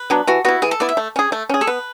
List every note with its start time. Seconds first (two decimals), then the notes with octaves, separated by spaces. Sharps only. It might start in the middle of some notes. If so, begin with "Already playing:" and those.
Already playing: B4
0.10 F#3 B3 D4
0.27 E3 F#4
0.44 B3 E4 F#4
0.62 E3 G#4
0.71 A4
0.80 B3 E4 D5
0.89 E5
0.97 A3
1.16 C#4 G#4
1.32 A3
1.49 C#4 G#4
1.61 A4
1.67 B3 B4